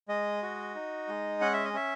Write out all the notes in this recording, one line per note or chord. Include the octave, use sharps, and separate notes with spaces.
G#3 D#5
F#4
D#4
G#3
C#4 F#5
E5
D#5
C#4 E5